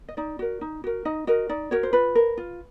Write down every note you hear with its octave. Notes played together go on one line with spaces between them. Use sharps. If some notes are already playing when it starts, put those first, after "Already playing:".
D#5
D#4 D5
F#4 A#4
D#4
F#4 A#4
D#4 D#5
F#4 A#4 D#5
D#4 D5
F#4 A#4 C#5
C5
F4 B4
A#4
F4